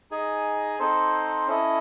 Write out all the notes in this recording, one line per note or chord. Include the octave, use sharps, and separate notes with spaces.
D#4 G#4 D#5 G#5
C4 D#4 A4 C5
C#4 E4 A4 D#5